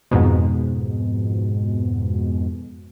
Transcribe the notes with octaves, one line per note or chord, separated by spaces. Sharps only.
F2 G#2 B2